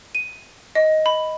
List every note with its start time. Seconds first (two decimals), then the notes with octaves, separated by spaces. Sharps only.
0.15 D#7
0.75 D#5
1.06 B5